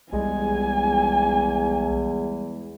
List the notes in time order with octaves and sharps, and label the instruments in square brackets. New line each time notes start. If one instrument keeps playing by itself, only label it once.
[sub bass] B1 [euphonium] E2 [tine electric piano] G3 G#3 [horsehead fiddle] G#5